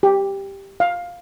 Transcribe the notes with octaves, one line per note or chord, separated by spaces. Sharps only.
G4
F5